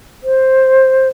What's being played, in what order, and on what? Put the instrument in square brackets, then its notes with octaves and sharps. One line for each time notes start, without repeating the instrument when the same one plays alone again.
[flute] C5